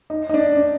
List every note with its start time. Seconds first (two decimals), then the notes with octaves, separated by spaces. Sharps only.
0.10 D#4
0.29 D#4
0.34 D4
0.57 D4